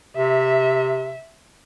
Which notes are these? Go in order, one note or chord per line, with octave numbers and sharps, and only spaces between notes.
C3 E5